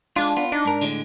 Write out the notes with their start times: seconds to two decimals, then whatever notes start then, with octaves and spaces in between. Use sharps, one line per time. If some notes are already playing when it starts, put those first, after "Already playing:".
0.16 G#3 D4 F4
0.37 B3 F4
0.52 D4 D#4
0.65 G#2 A#4
0.81 A2 D3 G#3